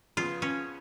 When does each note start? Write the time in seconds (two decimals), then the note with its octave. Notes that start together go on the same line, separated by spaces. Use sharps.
0.17 C#3 F3 B3 F4
0.42 C#4